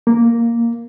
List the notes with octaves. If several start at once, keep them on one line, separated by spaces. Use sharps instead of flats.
A#3